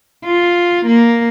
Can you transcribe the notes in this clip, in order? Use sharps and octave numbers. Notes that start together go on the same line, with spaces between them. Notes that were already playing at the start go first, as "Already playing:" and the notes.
F4
A#3